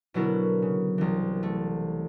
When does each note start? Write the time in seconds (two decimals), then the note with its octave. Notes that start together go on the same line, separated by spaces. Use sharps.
0.14 B2 D3 F#3 B3 E4 A#4
0.62 C#3
0.98 C2 E3
1.43 A3